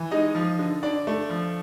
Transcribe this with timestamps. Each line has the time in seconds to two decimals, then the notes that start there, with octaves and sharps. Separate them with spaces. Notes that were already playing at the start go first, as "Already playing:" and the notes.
Already playing: E3
0.11 G#3 D#4 D#5
0.35 F3
0.59 D3
0.83 D3 D4 D5
1.07 A3
1.30 F3